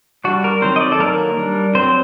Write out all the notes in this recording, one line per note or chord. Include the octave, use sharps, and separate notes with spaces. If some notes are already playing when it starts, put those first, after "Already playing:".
G3 D4 F#4
A#4
D#3 F#3 C4 C5
D#5
D5
A4
D#3 F#3 A#3 A#4
G3 D4
F#3 C4 C5